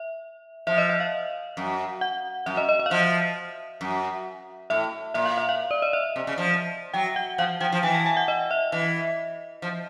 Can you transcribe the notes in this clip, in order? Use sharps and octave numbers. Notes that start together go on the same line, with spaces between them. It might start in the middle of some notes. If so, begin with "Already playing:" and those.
Already playing: E5
F3 E5
D#5
E5
F5
F#2
F#5
F#2 E5
D#5
D#5
D#5
F5
F3 E5
F#2
A2 E5
A#2 E5
F5
E5
F5
D5
D#5
E5
C3
C#3
F3
F#3 G5
F#5
F3 F5
F3 G5
F3
E3 G#5
A5
G#5
F#5
D#5
E5
E3 E5
F3